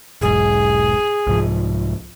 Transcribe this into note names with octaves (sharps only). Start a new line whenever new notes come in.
E1 B1 G#2 G#4
C2 G#2 F3